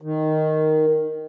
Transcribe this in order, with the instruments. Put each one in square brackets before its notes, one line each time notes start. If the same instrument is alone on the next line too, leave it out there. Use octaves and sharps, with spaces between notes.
[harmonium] D#3